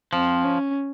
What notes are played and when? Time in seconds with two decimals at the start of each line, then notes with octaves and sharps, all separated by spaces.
0.13 F3 C4
0.45 C#4